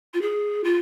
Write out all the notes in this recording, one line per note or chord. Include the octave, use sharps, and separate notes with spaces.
F4
G#4
F4